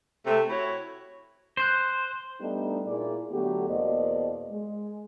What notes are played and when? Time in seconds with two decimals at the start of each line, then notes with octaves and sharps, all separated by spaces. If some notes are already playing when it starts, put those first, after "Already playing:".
0.25 C3 A3
0.50 E4 F#4 C#5
1.57 C5 F#6 G6 C7
2.41 G3 A3 B3 D4 D#4
2.87 A#2 E4 G#4 D5
3.32 D3 F#3 A3 B3 F#4 G4
3.69 E2 B2 A#3 C5 D5 D#5
4.50 G#3